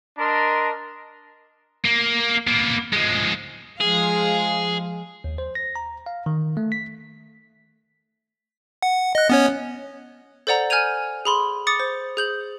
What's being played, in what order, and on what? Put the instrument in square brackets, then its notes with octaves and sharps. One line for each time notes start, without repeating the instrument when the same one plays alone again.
[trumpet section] D4 A#4 D#5 A5 A#5 C6
[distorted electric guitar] A#3
A#3 B3
F3 G#3
[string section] F3 G#3 F5 [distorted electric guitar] G#4
[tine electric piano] D#2
C5
A#6
A#5
F5
D#3
A3
B6
[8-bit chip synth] F#5
D#5 F#6
B3 C#4 C#5
[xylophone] A4 C5 D5 F#5 A#5
G#5 F6 G6 G#6 D#7 F7
G#4 B5 C6
D6 D#6 A6 C#7
C5
G#4 G6 F#7